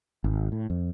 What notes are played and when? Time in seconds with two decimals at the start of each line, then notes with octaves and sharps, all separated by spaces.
0.24 G#1
0.52 A2
0.70 F2